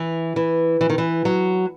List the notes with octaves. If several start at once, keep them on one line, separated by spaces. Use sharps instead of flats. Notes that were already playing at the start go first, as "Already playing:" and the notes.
Already playing: E3
E3
E3
D#3
E3
F#3